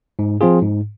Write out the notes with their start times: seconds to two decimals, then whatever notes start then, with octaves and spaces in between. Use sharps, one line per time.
0.19 G#2
0.41 F3 C4 F4 G#4
0.62 G#2